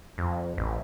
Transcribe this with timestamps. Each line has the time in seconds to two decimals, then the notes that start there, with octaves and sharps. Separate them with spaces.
0.18 F2
0.58 A1